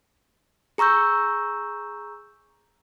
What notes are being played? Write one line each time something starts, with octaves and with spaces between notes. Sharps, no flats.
G#4 A#5 C#6 E6 G6